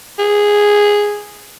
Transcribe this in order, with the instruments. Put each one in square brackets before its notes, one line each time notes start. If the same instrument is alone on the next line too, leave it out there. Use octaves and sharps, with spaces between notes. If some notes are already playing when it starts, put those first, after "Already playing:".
[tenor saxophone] G#4